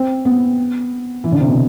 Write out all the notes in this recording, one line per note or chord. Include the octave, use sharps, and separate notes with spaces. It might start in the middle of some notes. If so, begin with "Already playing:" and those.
Already playing: C4
B3
E3
D3
C3
B2